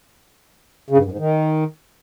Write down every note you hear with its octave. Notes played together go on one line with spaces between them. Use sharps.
C#3
G2
F#2
G#2
D#3